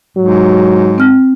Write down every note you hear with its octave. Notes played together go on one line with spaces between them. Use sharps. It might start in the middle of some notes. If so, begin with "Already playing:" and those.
G#2 F#3
C4 F6